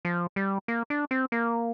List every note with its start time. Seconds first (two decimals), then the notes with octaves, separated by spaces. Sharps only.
0.05 F3
0.36 G3
0.68 A#3
0.90 D4
1.11 C4
1.32 A#3